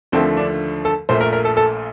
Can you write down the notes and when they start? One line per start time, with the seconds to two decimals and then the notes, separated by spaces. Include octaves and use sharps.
0.12 D#2 D3 F3 A3 C4
0.37 D4
0.85 A4
1.09 A#1 A#2 A3 C5
1.21 A#4
1.33 A#4
1.45 A4
1.57 A4